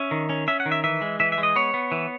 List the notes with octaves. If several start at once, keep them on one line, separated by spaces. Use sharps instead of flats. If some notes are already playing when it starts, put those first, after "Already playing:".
Already playing: C#4 E5
D#3
C#4
C#4 E5
F#5
D#3
E5
E3 E5
G#3
E3 E5
E5
G#3
D#5
B3 C#5
B3
E3